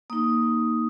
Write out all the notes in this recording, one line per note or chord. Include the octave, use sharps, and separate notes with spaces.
A#3 D#4 D#6